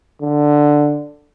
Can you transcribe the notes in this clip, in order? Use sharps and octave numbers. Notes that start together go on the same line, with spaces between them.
D3